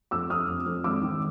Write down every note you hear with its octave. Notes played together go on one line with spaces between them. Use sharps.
F2 D6 E6
F2 D#6 F6
F2
F2
G#1 D6 E6
D#3